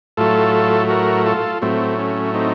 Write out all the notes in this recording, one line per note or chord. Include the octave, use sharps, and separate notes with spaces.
A2 F#3 A3 F4 A4
F#4 A#4
F4 A4
A2 F#3 A3 C4
C#4
C4 D#4